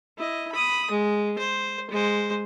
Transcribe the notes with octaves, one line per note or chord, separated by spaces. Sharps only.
E4 D#5
B5 D#6
G#3
C5
G#3 C5